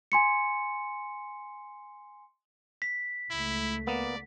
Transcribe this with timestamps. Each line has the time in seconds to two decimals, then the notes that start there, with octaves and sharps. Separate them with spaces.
0.12 G#5 C6 C#7
2.82 B6
3.31 C#2 A3 E4
3.87 A#3 B3 D5